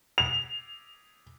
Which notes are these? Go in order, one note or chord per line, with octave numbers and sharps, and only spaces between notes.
F7